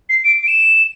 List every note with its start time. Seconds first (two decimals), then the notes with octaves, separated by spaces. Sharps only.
0.09 C7
0.24 D7
0.43 D7
0.48 E7